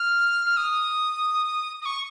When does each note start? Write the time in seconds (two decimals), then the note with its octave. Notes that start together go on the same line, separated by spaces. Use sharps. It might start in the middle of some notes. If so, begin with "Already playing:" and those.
Already playing: F6
0.46 F6
0.57 D#6
1.82 D#6
1.86 C#6